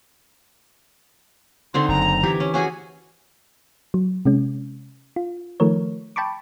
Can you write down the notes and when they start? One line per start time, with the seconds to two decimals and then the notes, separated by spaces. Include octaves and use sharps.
1.74 D3 C4 D#4 C6
1.88 F#1 A#5
2.23 E3 G4
2.40 C#4
2.54 C#4 F#4 G#4 G#5
3.94 F#3
4.25 C3 G#3 C#4
5.16 F4
5.60 D#3 F3 A3 A#4 C#5
6.16 G5 A5 B5 C#6 D6